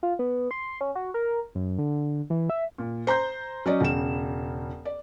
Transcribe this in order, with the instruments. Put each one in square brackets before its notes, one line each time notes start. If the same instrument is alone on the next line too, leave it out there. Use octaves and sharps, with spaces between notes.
[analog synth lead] F4
B3
C6
C#4
F#4
A#4
F#2
D3
E3
E5
[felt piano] A#2
C5 A#5 C6 G6
F#3 C#4 D5 D#5
E1 C#3 E7
D5